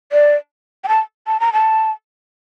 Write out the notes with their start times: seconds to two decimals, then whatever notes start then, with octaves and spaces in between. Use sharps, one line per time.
0.12 D5
0.84 G5
0.88 A5
1.27 A5
1.40 A#5
1.53 A5